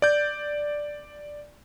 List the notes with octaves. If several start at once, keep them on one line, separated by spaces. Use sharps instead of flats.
D5 G6